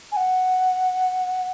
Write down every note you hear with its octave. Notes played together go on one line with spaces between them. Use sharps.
G#5
F#5